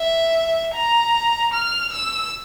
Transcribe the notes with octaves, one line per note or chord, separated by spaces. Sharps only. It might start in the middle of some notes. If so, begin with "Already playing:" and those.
Already playing: E5
A#5
F6
E6